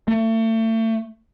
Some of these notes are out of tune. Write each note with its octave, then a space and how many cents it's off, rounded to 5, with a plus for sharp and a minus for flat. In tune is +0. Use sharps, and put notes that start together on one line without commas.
A3 +35